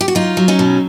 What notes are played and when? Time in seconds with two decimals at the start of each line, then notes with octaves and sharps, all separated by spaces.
0.01 G4
0.08 F#4
0.15 F#3 D#4 F4
0.37 F#3
0.48 C#4 D#4
0.59 B2